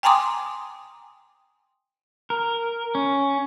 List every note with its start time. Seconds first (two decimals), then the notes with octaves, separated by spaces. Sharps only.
0.03 G5 G#5 A#5 C6 D6 D#6
2.30 A#4
2.95 C#4